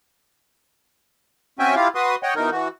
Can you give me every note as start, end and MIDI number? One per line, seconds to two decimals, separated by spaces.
1.59 1.75 60
1.59 1.75 61
1.59 1.75 66
1.59 1.75 76
1.59 1.75 79
1.59 1.75 80
1.75 1.88 64
1.75 1.88 65
1.75 1.88 67
1.75 1.88 77
1.95 2.16 66
1.95 2.16 71
1.95 2.16 84
1.95 2.16 87
2.23 2.34 73
2.23 2.34 75
2.23 2.34 78
2.23 2.34 79
2.36 2.50 47
2.36 2.50 52
2.36 2.50 63
2.36 2.50 70
2.51 2.68 52
2.51 2.68 66